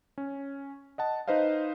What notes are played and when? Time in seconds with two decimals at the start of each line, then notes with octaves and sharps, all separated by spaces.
0.18 C#4
0.98 D#5 F#5 A5
1.28 D#4 B4 C5 D#5 F5